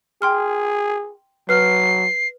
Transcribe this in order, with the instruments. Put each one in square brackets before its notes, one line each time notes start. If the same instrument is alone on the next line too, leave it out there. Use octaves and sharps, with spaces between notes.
[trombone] G#4 [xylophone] G5 C6 F6
[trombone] F#3 [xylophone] B4 F6 [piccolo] C7